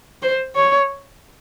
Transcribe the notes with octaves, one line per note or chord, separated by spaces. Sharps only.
C5
C#5